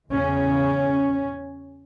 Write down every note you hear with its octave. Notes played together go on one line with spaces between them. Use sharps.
E2 C#3 C#4